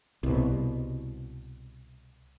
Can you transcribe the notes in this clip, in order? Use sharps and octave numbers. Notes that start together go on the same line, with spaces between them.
C2 B2